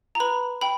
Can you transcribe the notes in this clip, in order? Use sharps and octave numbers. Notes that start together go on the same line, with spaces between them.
A#5
B4 B5
G5 B5